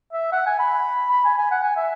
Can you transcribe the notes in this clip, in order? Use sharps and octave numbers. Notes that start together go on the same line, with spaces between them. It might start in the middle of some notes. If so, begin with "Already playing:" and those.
E5
F#5
G#5
B5
B5
G#5
G#5
F#5
G#5
E5